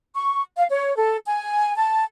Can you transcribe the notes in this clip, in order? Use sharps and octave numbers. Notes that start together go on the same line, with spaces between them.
C#6
F5
C#5
A4
G#5
A5